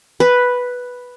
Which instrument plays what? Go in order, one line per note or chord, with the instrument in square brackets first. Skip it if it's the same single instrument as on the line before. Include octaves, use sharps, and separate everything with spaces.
[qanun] B4